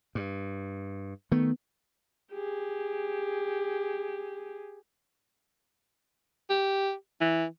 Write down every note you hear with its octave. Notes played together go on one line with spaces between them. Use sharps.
G2
D#3 A3 B3
G4 G#4
G4
E3